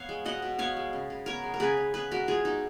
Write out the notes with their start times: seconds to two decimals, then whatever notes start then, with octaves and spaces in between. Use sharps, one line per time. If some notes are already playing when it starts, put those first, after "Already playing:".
Already playing: B3 C#5 F5
0.09 G#3
0.25 B2 D#5 F#5
0.42 B2
0.58 B3 C#5 F5
0.77 G#3
0.93 C#3
1.10 C#3
1.26 B3 A#4 C#5
1.43 G#3
1.54 A#4
1.60 C#3 G#4 B4
1.77 C#3
1.94 B3 G#4 B4
2.11 G#3 F#4 A#4
2.27 B2 F4 G#4
2.45 B2 D#4 F#4